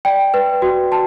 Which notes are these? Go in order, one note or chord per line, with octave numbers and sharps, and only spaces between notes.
D5 G5
B4
F#4
F#4 A5